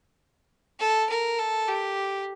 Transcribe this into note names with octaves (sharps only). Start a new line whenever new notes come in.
A4
A#4
A4
G4